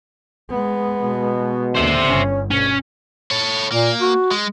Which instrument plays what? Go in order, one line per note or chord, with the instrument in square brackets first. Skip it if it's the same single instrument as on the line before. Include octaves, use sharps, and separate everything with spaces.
[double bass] G#3 B3
[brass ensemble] B2
[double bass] D#2 D3 [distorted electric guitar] C5 E5
[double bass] G1 [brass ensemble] C#4
[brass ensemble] D2 [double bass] B2 [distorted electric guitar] C#4
[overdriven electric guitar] A4 C#5
[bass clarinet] A#2 [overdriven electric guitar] A#3
[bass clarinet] F#4
[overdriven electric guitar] G#3